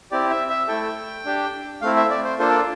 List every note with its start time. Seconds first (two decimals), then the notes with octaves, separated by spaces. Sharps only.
0.11 C4 E4 G4 D5
0.30 E5
0.50 E5
0.68 A3 E4 A4 G5
1.26 D4 G4
1.82 A3 C4 E4 F5
1.97 E5
2.11 D5
2.24 C5
2.39 A#3 D4 F4 A4 C5
2.50 D5